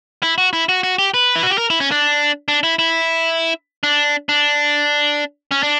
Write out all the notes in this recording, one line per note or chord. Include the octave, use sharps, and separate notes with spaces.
E4
F#4
E4
F#4
F#4
G4
B4
E4
F#4
G4
A#4
E4
C#4
D4
D4
E4
E4
D4
D4
C#4
D4